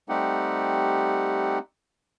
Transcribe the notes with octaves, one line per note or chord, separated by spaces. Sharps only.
G3 A3 C4 D#4 G4 F#5